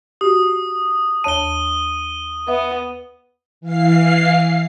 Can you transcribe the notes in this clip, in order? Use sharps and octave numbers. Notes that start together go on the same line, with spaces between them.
F#4 G4 D#6
D#2 C#5 A5 D#7 G7
B3 E5
E3 F5 C7